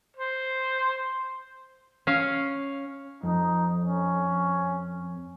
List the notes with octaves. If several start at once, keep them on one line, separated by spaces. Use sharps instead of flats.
C5
C#4 F5
F2 D#4
C#4